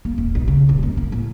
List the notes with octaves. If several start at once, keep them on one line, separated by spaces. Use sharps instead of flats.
A#3
D#1
B1
C#3
D#1
F#2
A#3
A2